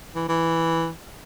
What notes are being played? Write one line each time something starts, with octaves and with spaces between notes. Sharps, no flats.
E3
E3